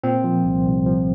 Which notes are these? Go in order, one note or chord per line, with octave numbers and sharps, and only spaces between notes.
A#2 C4
F3
C2
C2
F3